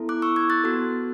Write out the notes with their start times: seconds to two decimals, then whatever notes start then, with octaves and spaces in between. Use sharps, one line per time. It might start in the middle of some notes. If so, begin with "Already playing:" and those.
Already playing: B3 E4 A4
0.09 D6 F#6
0.22 C#6 E6
0.36 E6 G#6
0.50 F#6 A6
0.64 B3 F#4 A4